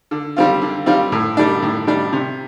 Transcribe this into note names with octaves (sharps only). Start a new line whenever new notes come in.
D3
G3 C4 F4
D3
G3 C4 F4
A2
G3 D4
A2
G3 D4
C3